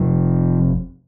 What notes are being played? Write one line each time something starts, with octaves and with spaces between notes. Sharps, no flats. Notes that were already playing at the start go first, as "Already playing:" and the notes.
Already playing: F1 F2 C3 F3